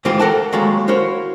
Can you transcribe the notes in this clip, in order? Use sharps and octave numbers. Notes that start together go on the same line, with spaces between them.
G#2 D#3 E3 C4 F4 G4
A4 A#4 F#5 G5 A5
D#2 F#3 G#3 A4 F5 A#5
E4 F#4 A#4 C5 C#5 F5